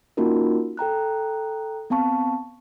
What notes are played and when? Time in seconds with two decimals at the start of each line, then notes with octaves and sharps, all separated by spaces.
0.17 A#3 C#4 D#4 F4 F#4 A#4
0.77 A4 G5 A#5 F#6
1.90 B3 C4 F5 A5 C#6